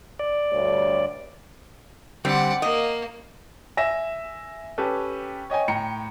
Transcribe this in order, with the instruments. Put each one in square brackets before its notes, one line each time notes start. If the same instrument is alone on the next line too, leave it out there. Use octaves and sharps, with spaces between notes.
[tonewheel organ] D5
[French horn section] D2 G2 C#5
[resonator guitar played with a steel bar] D3 G3 C4 [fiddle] D5 F#5
[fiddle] A#3 [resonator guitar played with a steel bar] D#5
[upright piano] E5 G#5 A#6 E7
C#4 G4 A4 B4
C#5 D#5 G5 G#5
A2 G5 A#5 C#7